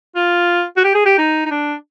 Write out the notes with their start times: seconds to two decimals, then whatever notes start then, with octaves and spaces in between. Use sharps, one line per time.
0.16 F4
0.77 F#4
0.84 G4
0.95 G#4
1.06 G4
1.18 D#4
1.45 D#4
1.51 D4